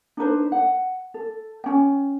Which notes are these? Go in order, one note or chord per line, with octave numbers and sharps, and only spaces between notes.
D4 D#4 B4 C5
F#5
A4
C#4 G5